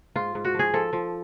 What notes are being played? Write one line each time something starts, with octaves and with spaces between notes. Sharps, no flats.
G#2 F4
G#2
F#4
F3 G#4
F3 A4
F3